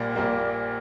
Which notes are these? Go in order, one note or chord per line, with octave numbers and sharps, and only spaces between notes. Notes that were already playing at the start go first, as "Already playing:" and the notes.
Already playing: A#1 A#2 G3 A#3
A#1 A#2 G3 A#3